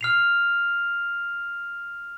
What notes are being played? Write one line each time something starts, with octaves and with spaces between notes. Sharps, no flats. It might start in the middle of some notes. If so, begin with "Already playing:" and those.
F6 C7 F7